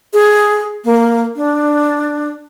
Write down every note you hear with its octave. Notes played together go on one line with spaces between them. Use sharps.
G#4
A#3
D4